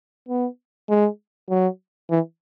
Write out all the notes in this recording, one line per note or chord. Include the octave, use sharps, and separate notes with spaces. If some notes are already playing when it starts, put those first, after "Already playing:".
B3
G#3
F#3
E3